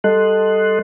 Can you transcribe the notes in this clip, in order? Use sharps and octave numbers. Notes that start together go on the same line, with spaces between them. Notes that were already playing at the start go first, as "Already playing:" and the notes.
G3 A4 D#5 C6 F#6